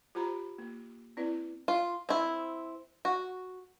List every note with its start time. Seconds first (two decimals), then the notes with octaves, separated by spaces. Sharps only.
0.15 F4 G4 C5 A#5 B5
0.58 A#3
1.17 C4 E4 B4 D5
1.68 F4
2.09 C4 E4
3.05 F#4